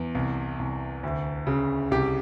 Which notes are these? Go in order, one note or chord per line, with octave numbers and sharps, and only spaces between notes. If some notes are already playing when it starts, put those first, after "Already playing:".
Already playing: E2
C2
C2
D2
C#3
C2 G4